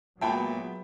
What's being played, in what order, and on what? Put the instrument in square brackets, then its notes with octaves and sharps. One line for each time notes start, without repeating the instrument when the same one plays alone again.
[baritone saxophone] A#2 [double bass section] F#3 G#3 B3 [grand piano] E5 G5 B5 [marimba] A5